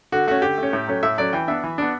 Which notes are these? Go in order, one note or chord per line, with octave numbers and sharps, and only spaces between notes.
D3 F#4
A3 C#4 F#4
D3 G4
A3 C#4
A2
F#3 A3 C#4
A2 E5
F#3 A3 C#4 D5
E3 G5
B3 D4 E5
E3
B3 D4